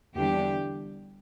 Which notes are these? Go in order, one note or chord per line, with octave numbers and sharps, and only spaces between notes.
E2 D3 G3 D4 G4